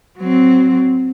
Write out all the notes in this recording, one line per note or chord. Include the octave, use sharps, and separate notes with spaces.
F#3 C4